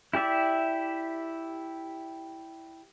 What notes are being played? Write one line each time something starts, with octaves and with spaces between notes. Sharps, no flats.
E4 G4 D5 E5